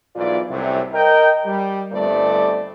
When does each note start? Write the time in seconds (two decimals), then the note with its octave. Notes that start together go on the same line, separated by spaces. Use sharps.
0.16 B1 G#2 E3 F4 D5
0.49 C2 F#2 A2 C3
0.93 A#4 D#5 G5
1.45 G3
1.91 G1 G2 G3 A3 C4 D5